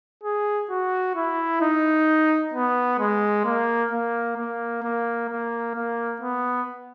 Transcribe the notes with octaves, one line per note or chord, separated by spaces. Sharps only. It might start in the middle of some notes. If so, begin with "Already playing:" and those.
G#4
F#4
E4
D#4
B3
G#3
A#3
A#3
A#3
A#3
A#3
A#3
B3